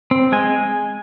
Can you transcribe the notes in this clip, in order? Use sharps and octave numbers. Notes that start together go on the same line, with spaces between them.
C4
G#3 G#5